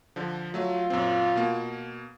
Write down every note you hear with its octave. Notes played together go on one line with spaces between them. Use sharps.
D3 F3
F#3 A3 F4 E5
F#2 A#2 C4
B2 A#3